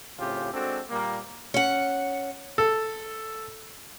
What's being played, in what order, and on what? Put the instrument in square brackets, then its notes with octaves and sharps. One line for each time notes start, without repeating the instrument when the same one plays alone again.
[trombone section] A2 C#3 C4 F4 G4
G#3 C4 D4 F#4 A4
A#2 G3 A#3
[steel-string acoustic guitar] C#4 F#5
[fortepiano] A4